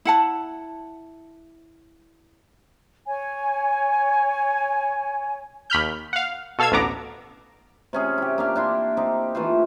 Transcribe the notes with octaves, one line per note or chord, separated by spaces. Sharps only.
E4 F#5 A5
C#5 G#5
D#2 B5 F6 G6
F5 F#5
B2 A4 F5 E6 G#6
A1 D2 B3 A#5 D6
C3 C#4 G#4
E4 G4
A#3 D4 F5
D4 E4 C6
C4 D#4 G4
E3 A3 F4 C5